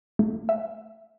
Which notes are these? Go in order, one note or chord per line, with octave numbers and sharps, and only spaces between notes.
A3
E5